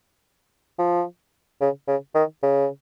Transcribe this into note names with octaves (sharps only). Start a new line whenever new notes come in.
F3
C#3
C#3
D#3
C#3